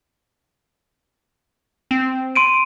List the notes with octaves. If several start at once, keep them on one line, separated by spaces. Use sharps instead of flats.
C4
C6 D7 D#7